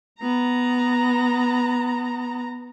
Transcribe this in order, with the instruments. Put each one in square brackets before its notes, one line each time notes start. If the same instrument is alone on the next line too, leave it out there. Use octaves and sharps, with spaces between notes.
[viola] B3 A#5